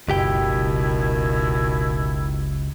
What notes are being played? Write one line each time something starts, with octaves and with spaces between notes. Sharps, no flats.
F#1 C#2 B2 D#3 E4 G4 G5